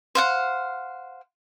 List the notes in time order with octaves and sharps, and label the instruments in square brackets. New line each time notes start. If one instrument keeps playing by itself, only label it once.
[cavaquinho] C5 F5 F#5